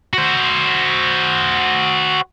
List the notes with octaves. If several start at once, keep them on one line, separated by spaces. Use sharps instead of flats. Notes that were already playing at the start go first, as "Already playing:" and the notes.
F#4 C5